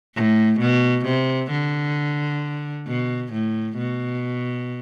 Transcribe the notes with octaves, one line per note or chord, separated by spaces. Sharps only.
A2
B2
C3
D3
B2
A2
B2